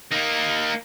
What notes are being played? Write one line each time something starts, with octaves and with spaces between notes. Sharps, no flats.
A#3 D#4